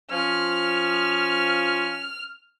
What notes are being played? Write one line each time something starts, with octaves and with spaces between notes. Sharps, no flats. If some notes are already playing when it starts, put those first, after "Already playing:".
F3 C#4 F6